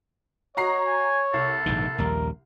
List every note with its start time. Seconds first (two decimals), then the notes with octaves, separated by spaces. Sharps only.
0.57 F#4 C#5 D#5 A#5 C7
0.87 G#5
1.34 C2 A4
1.66 A#1 G#2 D#3
1.98 A#1 D#2 G3 A#4